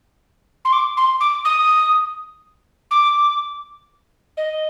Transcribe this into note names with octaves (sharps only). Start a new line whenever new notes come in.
C6
D6
C6
D6
D#6
D6
D#5